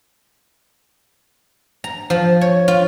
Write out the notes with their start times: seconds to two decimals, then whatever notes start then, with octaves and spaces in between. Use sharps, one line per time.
1.84 A#5
2.10 F3
2.41 C#5
2.68 F4